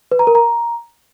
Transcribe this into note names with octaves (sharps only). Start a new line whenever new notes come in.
B4
A#5
A#4
A#5